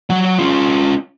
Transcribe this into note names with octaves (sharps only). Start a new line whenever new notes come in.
F#3 F#5
C#4 F4